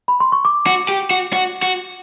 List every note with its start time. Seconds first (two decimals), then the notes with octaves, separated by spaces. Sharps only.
0.08 B5
0.20 C6
0.32 C#6
0.45 D6
0.66 F#4
0.89 G4
1.11 F#4
1.33 F#4
1.62 F#4